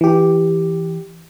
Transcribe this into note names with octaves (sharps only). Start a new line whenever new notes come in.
E3 G4